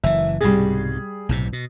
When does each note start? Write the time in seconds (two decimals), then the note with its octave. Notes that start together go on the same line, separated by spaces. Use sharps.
0.04 F#1 E3 E5
0.41 C2 G#2 B2 G3 G#4
1.29 B1 A2 C3
1.53 B2